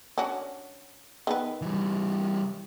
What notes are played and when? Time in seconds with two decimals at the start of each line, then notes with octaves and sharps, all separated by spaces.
0.18 C#4 D4 F#4
1.27 D#3 B3 B4
1.62 E3 G3